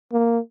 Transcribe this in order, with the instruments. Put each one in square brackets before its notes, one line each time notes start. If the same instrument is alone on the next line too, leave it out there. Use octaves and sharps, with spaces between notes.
[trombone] A#3